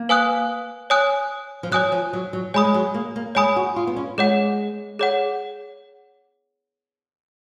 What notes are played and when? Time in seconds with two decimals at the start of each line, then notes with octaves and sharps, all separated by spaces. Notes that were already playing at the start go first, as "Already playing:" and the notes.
Already playing: A#3
0.09 B4 F5 G#5 D#6 F#6
0.90 C#5 G#5 D#6 F#6
1.63 F3
1.72 F#3 C#5 G#5 D#6 F#6
1.92 F3
2.13 F#3
2.33 F#3
2.54 G#3 C#5 G#5 B5 D#6
2.64 G#3
2.74 F#3
2.94 A#3
3.16 A#3
3.35 G#3 C#5 G#5 B5 D#6
3.56 F#4
3.76 F4
3.87 B3
3.97 C#4
4.18 G#3 G#4 C#5 F#5
4.99 G#4 C#5 F#5